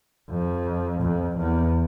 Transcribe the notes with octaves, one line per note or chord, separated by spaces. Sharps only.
F2
F2
E2